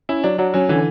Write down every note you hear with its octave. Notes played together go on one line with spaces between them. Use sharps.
C#4 E4
F#3 D4
F#3 D4
F#3 C#4
D3 E3